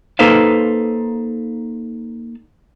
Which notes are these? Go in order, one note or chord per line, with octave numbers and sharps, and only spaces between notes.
A#3 D#4 A4 B4 C5 F5